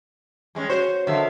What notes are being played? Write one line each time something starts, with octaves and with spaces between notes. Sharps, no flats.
G3 G#3 C#4
F#4 C5 C#5
D3 D#3 E5 F5